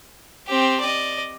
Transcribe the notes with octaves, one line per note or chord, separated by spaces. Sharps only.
C4 G4
D5 D#5